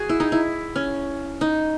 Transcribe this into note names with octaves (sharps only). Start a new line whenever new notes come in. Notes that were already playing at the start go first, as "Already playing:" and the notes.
Already playing: F#4 G#4
E4
D#4
E4
C#4
D#4